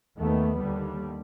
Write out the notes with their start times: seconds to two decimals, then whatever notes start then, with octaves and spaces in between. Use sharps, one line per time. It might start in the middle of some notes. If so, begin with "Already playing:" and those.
0.18 D#2 D#3 A3 B3
0.59 D#2 D3 G3